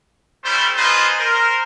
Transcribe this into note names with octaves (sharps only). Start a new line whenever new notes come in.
G3 A3 C#4 E4 C5
D#4 F4 G#4 B4 C5 D#5
A#4 C5